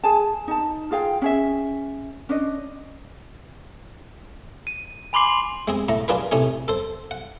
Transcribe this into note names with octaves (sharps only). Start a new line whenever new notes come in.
G#4 G#5 A5
D#4 A5
F4 G#4 F5 G5
C#4 G#4 E5
C#4 D4 D#5
D#7
G#5 B5 C6 D6 C7 F#7
G#3 C4 G#4
A2 A3 A#5
D4 F4 G#4 A#4 B4
A2 C3 A3 D#4 G#4
A4 C5
F#5